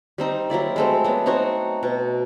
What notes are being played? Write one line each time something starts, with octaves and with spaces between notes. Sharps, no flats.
G3 C4 D#4
F#3 A#3 E4 D5
G#3 A3 C4
F#3 B3
C4 D#4 F#4 C#5
B2